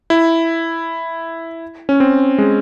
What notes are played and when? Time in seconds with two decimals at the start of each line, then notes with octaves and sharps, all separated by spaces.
0.10 E4
1.89 C#4
2.00 C4
2.38 G#3